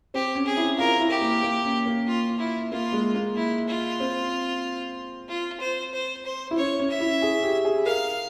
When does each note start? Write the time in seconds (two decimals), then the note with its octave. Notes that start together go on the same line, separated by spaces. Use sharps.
0.14 C4 G4
0.35 C#4
0.46 G#4
0.57 E4
0.78 F4 A#4
1.00 E4
1.10 G4
1.21 A#3
1.43 A#3
1.65 C#4
1.86 A#3
2.07 F4
2.39 E4
2.72 A#3 F4
2.93 G#3
3.14 A#3
3.36 E4
3.68 F4
4.00 C4
5.29 F4
5.60 C5
5.94 C5
6.25 C5
6.51 E4
6.57 C#4 C#5
6.79 C#4
6.89 E5
7.00 E4
7.22 G#4
7.43 G4
7.65 G#4
7.86 A#4 F5